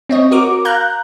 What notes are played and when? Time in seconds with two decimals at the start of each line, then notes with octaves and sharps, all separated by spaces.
0.09 C4 C#5 D#5
0.31 F#4 A#4 D6
0.65 F5 A#5 F#6 G6